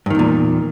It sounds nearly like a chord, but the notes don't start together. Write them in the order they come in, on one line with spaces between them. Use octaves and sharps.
G2 D#3 E2 A#2